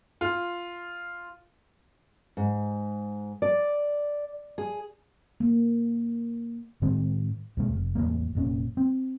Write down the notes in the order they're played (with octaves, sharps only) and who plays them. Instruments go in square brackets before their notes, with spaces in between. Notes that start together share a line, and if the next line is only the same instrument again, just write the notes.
[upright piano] F4
[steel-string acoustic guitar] G#2
D5
G#4
[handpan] A#3
[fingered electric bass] A2 D#3 G#3 C4
D#2 B2 G#3 A3
F1
A1 E2 A#2 A#3
F1 A#2 C#4
C4